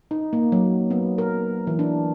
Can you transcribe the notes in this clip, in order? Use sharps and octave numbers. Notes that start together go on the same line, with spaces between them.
D#4
A#3
F#3
B3
A#4
E3
D4